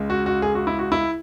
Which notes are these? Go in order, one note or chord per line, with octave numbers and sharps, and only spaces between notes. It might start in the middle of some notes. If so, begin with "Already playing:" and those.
Already playing: C#2 C#3 G#3
F#4
F#4
G#4
F#4
E4
F#4
E4